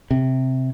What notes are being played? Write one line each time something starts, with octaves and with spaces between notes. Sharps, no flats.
C3